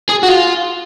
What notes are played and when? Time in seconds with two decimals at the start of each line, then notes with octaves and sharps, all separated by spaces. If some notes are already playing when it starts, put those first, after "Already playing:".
0.09 G#4
0.23 F#4
0.29 F4